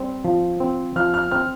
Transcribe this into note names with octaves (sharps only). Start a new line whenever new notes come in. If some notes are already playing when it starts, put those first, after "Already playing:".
Already playing: G3 C4
F3
C4
F3 F6
F6
C4 F6